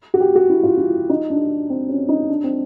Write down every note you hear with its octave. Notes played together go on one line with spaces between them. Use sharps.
F#4
G4
F#4
E4
F4
E4
D#4
D4
C4
C#4
D#4
D4
C4